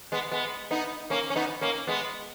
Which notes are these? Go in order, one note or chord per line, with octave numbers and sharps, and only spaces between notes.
G#3 B3
G#3 B3
B3 D#4
A#3 C#4
C#4
B3 D#4
A#3 C#4
G#3 B3